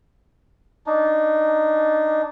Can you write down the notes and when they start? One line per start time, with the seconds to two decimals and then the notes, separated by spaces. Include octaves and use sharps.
0.86 D4 D#4